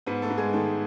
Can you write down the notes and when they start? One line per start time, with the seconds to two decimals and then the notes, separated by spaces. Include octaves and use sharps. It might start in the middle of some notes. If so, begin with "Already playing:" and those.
0.06 G#2 B3 B4
0.22 A3 A4
0.30 G#2
0.38 G#3 G#4
0.53 D#3 A3 A4